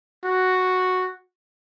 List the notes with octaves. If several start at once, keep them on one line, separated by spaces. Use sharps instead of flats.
F#4